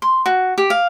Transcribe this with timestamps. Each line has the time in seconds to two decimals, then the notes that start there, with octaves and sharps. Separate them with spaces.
0.02 C6
0.26 F#4
0.58 G4
0.70 F5